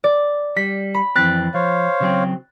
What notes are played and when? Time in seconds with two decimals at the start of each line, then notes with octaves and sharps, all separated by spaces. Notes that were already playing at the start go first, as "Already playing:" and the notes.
0.04 D5
0.57 G3 B6
0.94 B5
1.16 F2 E3 C4 F#6 A6 B6
1.54 F3 C5 C#5 F5
2.00 C#3 F#3 C4